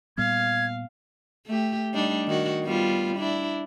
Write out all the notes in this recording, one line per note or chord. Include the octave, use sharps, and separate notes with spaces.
A#2 G3 B3 F5 G#6
A3 G4
G3 D4 D#4
D#3 F#4
G3 B3 F4
D4 E4